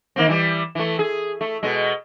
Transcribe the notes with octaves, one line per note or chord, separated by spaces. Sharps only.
D#3 A#3 C4
E3 G3
E3 A3
G#4
A3
B2 G#3